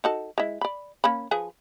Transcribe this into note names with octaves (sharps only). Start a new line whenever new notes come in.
D#4 F#4 A4
G#3 E4
D5 B5
A#3 C#4 B5
F3 G#4 B4